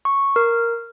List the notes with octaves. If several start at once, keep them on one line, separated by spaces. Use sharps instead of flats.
C#6
A#4